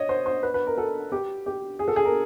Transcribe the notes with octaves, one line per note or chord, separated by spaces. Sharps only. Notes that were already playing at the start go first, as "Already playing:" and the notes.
Already playing: C#5 D#5
C5
C5
B4
B4
A#4
A4
G4
G4
G#4
A4
G#4
A#4